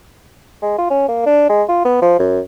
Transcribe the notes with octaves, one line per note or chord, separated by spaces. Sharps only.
G#3
F4
C#4
A#3
D4
G#3
F4
B3
F3
F#2